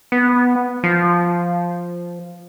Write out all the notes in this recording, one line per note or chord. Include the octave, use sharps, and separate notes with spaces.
B3
F3